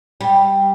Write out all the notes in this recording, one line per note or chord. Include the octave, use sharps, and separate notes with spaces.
G3